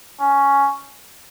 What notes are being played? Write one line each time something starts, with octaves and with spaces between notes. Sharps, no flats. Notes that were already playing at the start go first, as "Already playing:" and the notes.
C#4